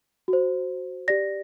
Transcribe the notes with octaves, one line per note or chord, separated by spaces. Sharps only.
F#4
C5
G4 D5 A#6